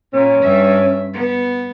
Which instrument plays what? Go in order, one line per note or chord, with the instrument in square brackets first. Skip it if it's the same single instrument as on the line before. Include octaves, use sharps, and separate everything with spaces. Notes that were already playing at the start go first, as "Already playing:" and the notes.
[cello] A#2 [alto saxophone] C#4
[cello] G2 E5
B3